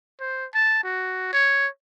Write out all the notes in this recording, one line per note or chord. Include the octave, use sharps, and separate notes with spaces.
C5
A5
F#4
C#5